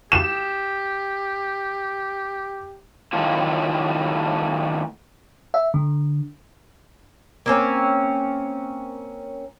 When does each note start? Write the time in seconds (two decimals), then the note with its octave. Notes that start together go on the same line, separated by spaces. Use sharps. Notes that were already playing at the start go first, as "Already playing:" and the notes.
0.12 G4 E7
3.13 A2 D#3 F#3 A3 F4
5.54 E5
5.74 D3
7.46 A#3 C4 C#4